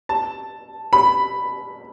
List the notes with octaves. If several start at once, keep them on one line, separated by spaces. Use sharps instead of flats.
A5
B5